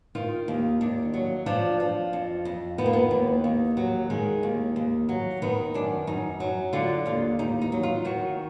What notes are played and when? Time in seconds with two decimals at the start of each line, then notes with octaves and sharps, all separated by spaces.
0.15 D#3 F4
0.48 D#2
0.81 D#2 D4
1.14 F#3
1.46 F3 D4
1.80 F3
2.13 F2
2.45 F2
2.78 D#3 B3
2.86 A#3
2.93 B3
3.11 D#2
3.44 D#2
3.77 F#3
4.10 D#3 G#3
4.43 D#2
4.76 D#2
5.09 F#3
5.42 D#3 B3
5.74 F#2 D4
6.07 F#2 D#4
6.40 F#3
6.73 D3 F4
7.06 D#2 F4
7.39 D#2 D#4
7.62 D#4
7.72 F#3
7.83 F4
8.05 D#3 F#4